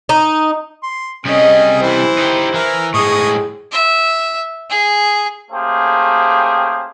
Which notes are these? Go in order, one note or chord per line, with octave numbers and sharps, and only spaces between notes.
D#4
C6
C3 G3 C#4 G#4 D#5
E3 E4 C5
D#4 G4
E3 A#4
A2 G#3 G#4 D#5 C#6 D#6
E5
G#4
A3 A#3 C#4 G4 G#4 C5